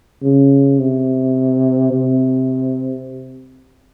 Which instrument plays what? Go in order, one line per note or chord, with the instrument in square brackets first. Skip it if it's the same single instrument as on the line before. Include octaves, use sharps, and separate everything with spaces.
[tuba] C#3
C3
C3